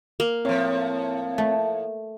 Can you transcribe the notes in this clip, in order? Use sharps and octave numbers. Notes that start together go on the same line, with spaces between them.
A#3
A2 F3 C4 C#5
A3